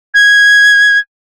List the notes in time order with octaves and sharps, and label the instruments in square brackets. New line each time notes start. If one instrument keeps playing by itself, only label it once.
[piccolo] G#6